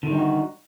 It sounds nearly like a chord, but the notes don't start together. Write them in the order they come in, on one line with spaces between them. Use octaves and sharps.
D3 D#3 G3 D#4 F#4